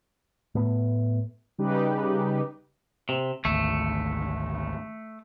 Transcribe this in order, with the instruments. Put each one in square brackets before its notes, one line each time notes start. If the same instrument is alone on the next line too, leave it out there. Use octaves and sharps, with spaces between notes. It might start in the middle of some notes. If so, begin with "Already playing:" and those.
[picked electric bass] A2 A3 B3
[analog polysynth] C#3 G3 D#4 G4 B4
[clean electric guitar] C3
[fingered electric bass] G#1 D2 [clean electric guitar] A3